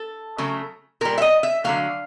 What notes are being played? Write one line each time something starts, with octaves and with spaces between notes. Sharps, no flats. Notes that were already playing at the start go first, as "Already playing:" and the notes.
Already playing: A4
C#3 F#3 A3
A#2 G3 A#4
E5
D#5
E5
D3 F#3 A3 F5